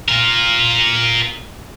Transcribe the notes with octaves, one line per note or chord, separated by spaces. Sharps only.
F4 A#4